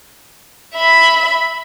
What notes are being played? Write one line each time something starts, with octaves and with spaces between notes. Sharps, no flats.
E5 B5